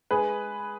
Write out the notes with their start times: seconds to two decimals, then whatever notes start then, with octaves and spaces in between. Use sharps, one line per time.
0.11 G#3 G#4 B4